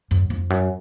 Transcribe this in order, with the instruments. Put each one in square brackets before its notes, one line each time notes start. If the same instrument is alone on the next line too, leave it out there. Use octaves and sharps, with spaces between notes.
[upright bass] F#2
F2
F#2